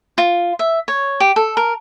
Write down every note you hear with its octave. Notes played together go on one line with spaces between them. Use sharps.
F4
E5
C#5
G4
A4
A#4